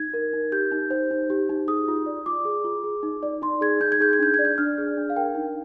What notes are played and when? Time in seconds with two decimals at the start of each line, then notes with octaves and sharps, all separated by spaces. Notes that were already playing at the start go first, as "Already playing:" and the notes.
Already playing: D#4 G#6
0.14 A#4
0.33 D#4
0.52 G4 G6
0.72 D#4
0.90 C5
1.11 D#4
1.30 G4
1.49 D#4
1.68 G#4 D#6
1.88 F4
2.06 D5
2.26 F4 D6
2.45 G#4
2.64 F4
2.84 G#4
3.03 D#4
3.23 D5
3.42 D#4 C6
3.61 G#4 G#6
3.80 D#4 G6
3.92 G#6
4.00 G#4 G6
4.13 G#6
4.19 D4 G6
4.34 G#6
4.39 D5
4.45 G6
4.58 D4 F6
4.78 G#4
4.97 D4
5.10 F5
5.16 A#4 G5
5.35 D#4